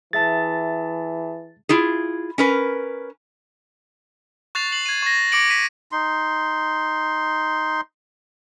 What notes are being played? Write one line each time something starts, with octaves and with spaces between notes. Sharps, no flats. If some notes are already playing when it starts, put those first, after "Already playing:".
E3 G#4 E5 A5 A6
E4 F4 G#4
C#4 A#4 B4
C#6 F#6 A6 C7 F7
C7 F#7
G#6 D#7
C#6 A#6
D6 A#6 C#7 D7 F#7
B6 D#7
D#4 C6